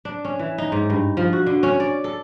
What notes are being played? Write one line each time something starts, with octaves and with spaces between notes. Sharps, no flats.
D4
C#4
E3
D#4
G#2
G2
F3
F#4
D3
C#4
D5
A4